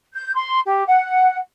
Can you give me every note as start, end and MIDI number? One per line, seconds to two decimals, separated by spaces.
0.13 0.33 91
0.34 0.59 84
0.65 0.83 67
0.87 1.37 78